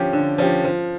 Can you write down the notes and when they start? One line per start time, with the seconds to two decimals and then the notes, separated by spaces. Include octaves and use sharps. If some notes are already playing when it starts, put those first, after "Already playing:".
Already playing: D3 F3 C#4 G4
0.13 D3
0.38 F3 C#4 G4
0.64 F3